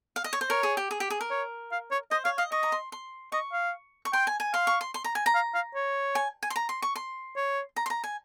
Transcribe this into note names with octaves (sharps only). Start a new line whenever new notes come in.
F5
D#5
C#5
C5
A#4 C#5
G#4
G4
G#4
G4
G#4
A#4
C#5
F5
C#5
C5 D#5
C#5 F5
D#5 F5
D#5 C#6
A#5
C6
C6
D#5 C#6
F5
C#6
G5 C6
G#5
G#5
F5 C6
C#6
C6
C6
A#5
G#5
A#5
F5
F5
C#5
G#5
G#5
C6
A#5
C6
C#6
C6
C#5
A#5
C6
A#5
G#5